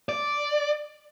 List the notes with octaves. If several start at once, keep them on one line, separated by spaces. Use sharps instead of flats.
D5